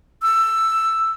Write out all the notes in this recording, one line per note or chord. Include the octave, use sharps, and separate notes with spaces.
E6